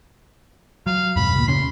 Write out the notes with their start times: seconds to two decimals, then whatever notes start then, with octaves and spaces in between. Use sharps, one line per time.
0.86 F#3 F5
1.16 E1 G2 B2 B5
1.36 C#2 A#2
1.47 F2 C#3 C#4 C6